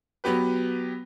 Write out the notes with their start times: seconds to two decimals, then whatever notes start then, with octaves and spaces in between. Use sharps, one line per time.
0.24 F#3 B3 G4 B4